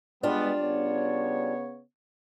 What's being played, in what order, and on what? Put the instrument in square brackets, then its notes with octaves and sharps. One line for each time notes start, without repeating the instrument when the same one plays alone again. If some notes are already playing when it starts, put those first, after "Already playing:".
[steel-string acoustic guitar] G3 D4 F4 [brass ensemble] G#3 B3
[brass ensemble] C#3 B3 C#5